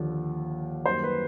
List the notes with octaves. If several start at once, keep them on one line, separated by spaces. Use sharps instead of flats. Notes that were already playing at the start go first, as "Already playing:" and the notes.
Already playing: D#2 D3 F3
F#2 D#3 G3 A#3 C5
B4